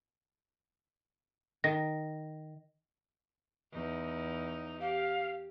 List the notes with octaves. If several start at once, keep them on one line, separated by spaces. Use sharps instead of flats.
D#3 A#6
E2 D#4
G4 F5